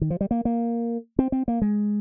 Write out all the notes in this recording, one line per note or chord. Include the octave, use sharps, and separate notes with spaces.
D#3
F3
G3
A#3
A#3
C4
C4
A#3
G#3